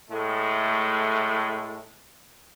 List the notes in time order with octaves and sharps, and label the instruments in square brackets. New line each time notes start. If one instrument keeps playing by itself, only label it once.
[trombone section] A2 G#3 A3